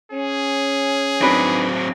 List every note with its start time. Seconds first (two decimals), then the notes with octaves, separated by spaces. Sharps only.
0.12 C#4 G#4
1.21 F#3 C4 D4 D#4 B4